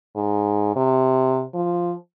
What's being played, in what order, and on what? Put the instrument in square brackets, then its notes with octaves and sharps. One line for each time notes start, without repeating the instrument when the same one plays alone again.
[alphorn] G#2
C3
F3